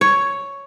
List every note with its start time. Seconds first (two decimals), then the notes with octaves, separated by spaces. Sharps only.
0.01 C#5